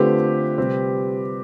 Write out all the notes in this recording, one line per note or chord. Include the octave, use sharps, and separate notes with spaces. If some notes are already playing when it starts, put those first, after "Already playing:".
Already playing: D3 A3 C4 F4 G4 B4 C5
C3 G3 C4 G4